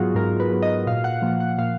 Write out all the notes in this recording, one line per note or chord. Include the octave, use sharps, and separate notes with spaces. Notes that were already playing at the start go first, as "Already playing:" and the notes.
Already playing: G#2 F#3 B3 F4 F#4 G#4
G#2 A#4
B4
F#3 B3
D#5
A#2 F5
F#5
F3 A#3
F#5
A#2 F5